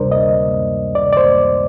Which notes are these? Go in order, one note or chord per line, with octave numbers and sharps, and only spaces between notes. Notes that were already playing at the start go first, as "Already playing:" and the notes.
Already playing: D2 C3 G3 D4 A#4 C5 D5
D#5
D5
D5
C5